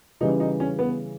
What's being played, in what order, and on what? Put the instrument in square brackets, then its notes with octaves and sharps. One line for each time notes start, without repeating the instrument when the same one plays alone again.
[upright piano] C#3 E3 G3 [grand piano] D#4
[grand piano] D#4
C#4
B3